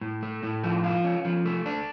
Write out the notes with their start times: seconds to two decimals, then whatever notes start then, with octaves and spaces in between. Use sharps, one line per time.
0.01 A2
0.22 A3
0.43 A2
0.64 F3
0.84 F4
1.04 C#4
1.25 F3
1.46 A3
1.66 D4